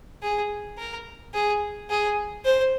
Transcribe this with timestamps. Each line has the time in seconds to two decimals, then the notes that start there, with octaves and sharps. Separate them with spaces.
0.23 G#4
0.78 A#4
1.34 G#4
1.90 G#4
2.45 C5